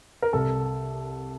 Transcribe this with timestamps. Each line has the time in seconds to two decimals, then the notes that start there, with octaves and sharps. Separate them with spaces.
0.22 A#4
0.33 C2 A4